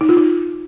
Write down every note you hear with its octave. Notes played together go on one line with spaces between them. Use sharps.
D#4
F4
D#4